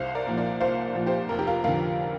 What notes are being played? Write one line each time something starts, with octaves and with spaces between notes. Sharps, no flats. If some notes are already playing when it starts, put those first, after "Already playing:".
Already playing: C2 C5 F5
A#4 D5
A#2 F3
A#4 D5
C2 C5 F5
A#2 F3
G4 C5
F1 A#4
G4
F4 A#4
F2 D3 F4 A#4